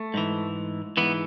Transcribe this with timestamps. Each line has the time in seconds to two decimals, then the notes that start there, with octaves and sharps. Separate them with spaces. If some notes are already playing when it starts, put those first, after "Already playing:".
Already playing: A3
0.14 G#2 E3
0.97 G#2 E3 B3